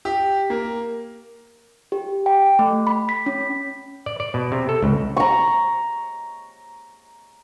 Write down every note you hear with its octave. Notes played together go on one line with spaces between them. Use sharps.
G4
A#3
G4
G5
A3
B5
B6
C#4
D5
D5
B2
C3
A4
C#2
A#5 C#6